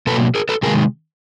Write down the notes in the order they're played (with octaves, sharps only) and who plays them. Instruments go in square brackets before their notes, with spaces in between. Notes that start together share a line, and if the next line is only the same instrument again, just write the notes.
[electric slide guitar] B2 F#3 A#3 A4 B4
G#4 A#4
A4 B4
C3 D#3 G#3 G#4 A#4